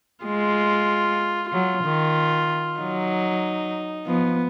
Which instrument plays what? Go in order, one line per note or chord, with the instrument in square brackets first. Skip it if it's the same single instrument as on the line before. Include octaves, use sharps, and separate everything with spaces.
[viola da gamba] G#3 [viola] F4
[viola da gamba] F#3 [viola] F4
[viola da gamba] D#3
[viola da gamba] F#3 [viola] D#4
[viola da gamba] F3 [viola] B3